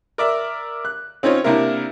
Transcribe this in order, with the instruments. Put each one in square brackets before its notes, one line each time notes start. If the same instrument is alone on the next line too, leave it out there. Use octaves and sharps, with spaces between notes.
[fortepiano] A#4 D5 E5
F#6
C4 C#4 D#4 F4 C#5
C3 A#3 D4 E4 A#4